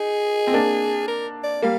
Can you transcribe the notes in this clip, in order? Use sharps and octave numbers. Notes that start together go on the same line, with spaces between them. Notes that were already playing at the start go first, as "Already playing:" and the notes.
Already playing: D#4 G#4
C4
A#3 D4
A#4
D5
G3 A#3 F5